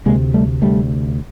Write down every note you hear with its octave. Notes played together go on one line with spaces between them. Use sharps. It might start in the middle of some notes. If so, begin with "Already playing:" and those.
D2 C3 G#3 A#3
G3 A3
D2 C3 G3 A3